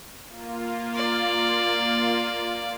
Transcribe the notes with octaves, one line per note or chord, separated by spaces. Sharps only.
A#3 F4
D5